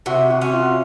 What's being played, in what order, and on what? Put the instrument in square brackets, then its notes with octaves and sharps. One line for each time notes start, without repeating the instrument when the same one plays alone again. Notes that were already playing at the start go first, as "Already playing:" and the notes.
[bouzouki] C3 [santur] F#4
[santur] F#4
[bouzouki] C#4
[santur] F4